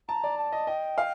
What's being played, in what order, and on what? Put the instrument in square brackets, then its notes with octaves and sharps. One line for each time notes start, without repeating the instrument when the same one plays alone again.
[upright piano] A5 [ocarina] A#5
[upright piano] D5
[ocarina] A5
[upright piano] D#5
[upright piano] D#5 [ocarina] G5
[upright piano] F5